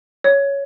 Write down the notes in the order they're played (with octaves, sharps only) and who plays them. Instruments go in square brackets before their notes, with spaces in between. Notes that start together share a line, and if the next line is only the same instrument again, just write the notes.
[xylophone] C#5